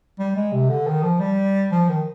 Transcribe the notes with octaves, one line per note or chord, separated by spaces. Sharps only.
G3
G#3
C3
D3
D#3
F3
G3
F3
D#3